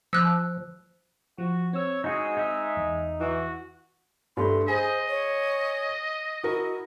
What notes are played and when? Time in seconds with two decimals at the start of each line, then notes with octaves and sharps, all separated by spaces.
0.13 F3 E6 F#6
1.38 F3 F#4
1.73 C4 C#5 E6
2.04 G#3 D#4 F#4 G#4
2.37 D#4 E5
2.76 E2
3.20 E3 F#4
4.37 G2 A3 C6
4.68 G#4 C5 D#5
5.08 C#5
6.44 E4 F#4 A#4